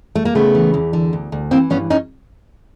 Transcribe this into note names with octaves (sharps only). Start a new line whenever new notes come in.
A3
A#3
C#3 A3 B3
E3
E2
D3
D2
D2
E3 A#3 C4
G2 B3 C#4
C#4 D#4